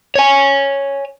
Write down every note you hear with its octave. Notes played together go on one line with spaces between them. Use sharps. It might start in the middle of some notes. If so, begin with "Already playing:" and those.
C#5 G#5